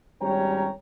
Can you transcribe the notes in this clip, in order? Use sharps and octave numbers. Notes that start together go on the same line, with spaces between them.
G#1 G3 C#4 C#5 G5 A#5